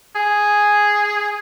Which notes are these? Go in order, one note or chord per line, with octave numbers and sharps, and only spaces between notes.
G#4